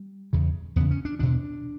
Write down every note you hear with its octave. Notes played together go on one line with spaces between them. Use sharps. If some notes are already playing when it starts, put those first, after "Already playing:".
Already playing: G3
E2 C#3
E2 C#3 B3
C#4
D4
E2 B2 D4